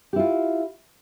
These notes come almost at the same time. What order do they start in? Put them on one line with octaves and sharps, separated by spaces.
G4 E4 F4